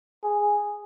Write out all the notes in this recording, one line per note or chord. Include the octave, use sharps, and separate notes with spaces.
G#4